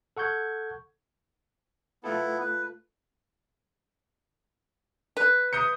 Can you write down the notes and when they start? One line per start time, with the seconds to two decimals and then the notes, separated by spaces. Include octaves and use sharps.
0.17 A4 F#5 C#6 G6 G#6
2.04 A3 B3 E4 F4 A4
2.40 B4
5.17 B4
5.53 D#6 G6 C#7